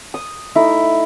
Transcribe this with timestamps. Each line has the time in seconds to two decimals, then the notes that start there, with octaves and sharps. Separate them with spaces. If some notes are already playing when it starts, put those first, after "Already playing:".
0.14 D#6
0.55 A3 D#4 E4